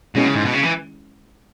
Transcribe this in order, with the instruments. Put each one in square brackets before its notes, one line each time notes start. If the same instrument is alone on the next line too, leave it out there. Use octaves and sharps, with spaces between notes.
[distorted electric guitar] B2 [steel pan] G#3 C#4 E4 G#4
[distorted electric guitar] C#3
G#2
B2
C#3
E3